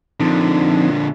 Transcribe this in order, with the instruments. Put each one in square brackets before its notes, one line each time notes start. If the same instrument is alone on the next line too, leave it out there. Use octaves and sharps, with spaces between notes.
[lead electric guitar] A#2 D3 [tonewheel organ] F3 C4 D#4